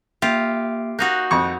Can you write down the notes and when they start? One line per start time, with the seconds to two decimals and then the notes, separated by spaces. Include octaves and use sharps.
0.22 A#3 F4 G4 E5
0.99 A#3 D#4 F#4 F#6 G6
1.31 F2 C#6